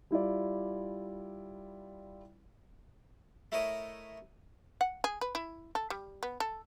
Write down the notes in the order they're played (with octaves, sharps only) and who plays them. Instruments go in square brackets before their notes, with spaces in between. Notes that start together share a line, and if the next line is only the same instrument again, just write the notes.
[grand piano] G3 E4 F4 D5
[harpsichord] A3 E4 A#4 C#5 D#5
[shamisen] F#5
G#4
B4
E4
A4
G3
B3
A4